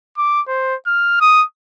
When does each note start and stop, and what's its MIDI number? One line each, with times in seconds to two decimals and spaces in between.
0.18 0.41 86
0.48 0.75 72
0.87 1.18 89
1.21 1.44 87